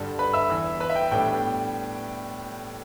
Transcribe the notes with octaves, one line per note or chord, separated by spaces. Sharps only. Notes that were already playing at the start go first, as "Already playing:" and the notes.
Already playing: G2 D3 G3 A4 A5
B4 B5
E5 E6
E2 E3 B3
B4 B5
E5
G5
A2 G3 B3 D4 G5